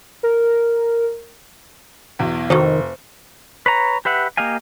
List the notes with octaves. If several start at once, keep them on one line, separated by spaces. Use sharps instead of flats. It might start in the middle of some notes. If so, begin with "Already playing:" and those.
A#4
B1 E2
F1 D#3 F#4 A4 C5 D#5
B4 C#5 A#5
G4 B4 E5 F#5
A#3 G4 D#5 F5 G#5